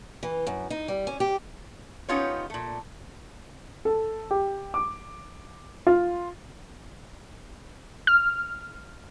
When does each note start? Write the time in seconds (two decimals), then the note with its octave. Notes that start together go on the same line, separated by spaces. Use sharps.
0.23 E3
0.47 F#2
0.70 D#4
0.88 G3
1.07 C#4
1.20 G4
2.09 B3 C#4 D#4 F4 G4 C#5
2.50 A#2 A3
3.85 A4
4.31 G4
4.74 D6
5.87 F4
8.07 F6